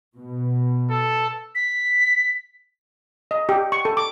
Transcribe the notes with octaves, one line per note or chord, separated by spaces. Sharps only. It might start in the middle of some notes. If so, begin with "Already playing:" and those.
B2
A4
B6
D#5
G4
C#6
A4
D6